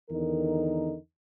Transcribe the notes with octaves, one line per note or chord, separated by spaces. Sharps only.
E2 D3 D#3 D#4 A#4